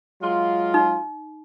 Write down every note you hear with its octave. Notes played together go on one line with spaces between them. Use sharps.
F#3 G#3 F4
D#4